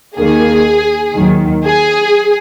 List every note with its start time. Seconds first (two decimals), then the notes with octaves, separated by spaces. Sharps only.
0.17 D#2 D#3 A#3 G#4
1.15 D#2 D#3 F#3
1.65 G#4